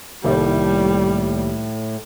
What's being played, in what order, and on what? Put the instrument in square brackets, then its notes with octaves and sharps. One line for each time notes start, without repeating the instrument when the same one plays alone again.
[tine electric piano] C2 D#3 A#3 [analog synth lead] A2 [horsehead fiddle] G3